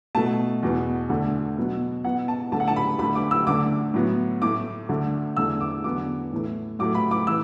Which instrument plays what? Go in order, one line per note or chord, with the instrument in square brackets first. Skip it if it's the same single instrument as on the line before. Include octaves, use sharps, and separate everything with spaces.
[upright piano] B2 A3 A5
E2 B2 B3
D2 D3 A3
B2 F#3 B3
B2 B3 F#5
A5
D2 D3 A3 A5
F#5
A5
B5
D2 D3 A3 B5
D6
E6
D2 D3 A3 D6
A2 F#3 B3
A2 A3 D6
D2 D3 A3
E2 D3 A3 E6
D6
E2 D3 F#3 B3 D6
A2 E3 A3
A2 F#3 A3 D6
B5
D6
E3 E6